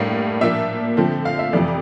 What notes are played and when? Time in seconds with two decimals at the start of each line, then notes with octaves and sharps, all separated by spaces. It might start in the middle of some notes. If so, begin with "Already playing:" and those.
Already playing: A2 G3 A#3 D4 F5
0.41 A#2 F3 A#3 D4 E5
0.97 D3 F3 A3 C4
1.25 F5
1.39 E5
1.53 F2 C3 E3 A3 D5